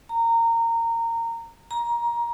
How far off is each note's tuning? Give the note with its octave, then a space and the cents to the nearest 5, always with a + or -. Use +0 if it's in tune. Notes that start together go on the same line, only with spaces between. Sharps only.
A#5 -20
A#5 +20